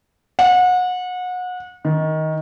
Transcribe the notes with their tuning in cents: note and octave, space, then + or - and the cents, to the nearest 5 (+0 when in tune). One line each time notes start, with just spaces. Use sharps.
F#5 -30
D#3 +15